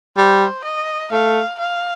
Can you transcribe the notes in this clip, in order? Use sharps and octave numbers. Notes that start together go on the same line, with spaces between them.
G3 C5
D#5
A3 F5
F5